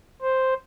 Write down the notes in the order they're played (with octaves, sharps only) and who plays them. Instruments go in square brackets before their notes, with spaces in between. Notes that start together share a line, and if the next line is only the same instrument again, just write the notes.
[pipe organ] C5